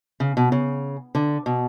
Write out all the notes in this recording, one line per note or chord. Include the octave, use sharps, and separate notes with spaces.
C#3
B2
C#3
D3
B2